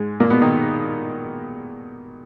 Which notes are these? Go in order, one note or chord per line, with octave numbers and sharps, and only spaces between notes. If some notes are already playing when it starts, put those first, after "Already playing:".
Already playing: G#2 G#3
A#2 A#3
B2 B3
D#3 D#4